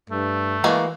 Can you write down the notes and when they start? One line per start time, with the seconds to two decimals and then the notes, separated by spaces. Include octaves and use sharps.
0.10 G2 A3
0.64 E3 G#3 A#3 F#4